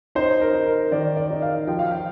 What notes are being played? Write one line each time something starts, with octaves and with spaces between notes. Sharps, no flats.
D#4 C5
A#4
D#4
A#4
D#3 D5
D5
D#4
F5
F3 G5
F5
G5